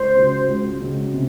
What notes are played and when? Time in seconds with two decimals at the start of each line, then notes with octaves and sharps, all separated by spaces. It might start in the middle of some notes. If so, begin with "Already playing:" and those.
Already playing: C#2 C5
0.15 C#3 G#3 C#4 F#4
0.48 C#2
0.80 C#3 G#3 C#4 F#4
1.13 C3